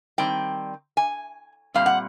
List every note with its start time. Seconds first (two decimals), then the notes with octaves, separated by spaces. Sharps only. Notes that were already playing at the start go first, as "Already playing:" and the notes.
0.18 D#3 G3 C4 G5
0.97 G#5
1.74 A#2 G3 C4 F5
1.86 F#5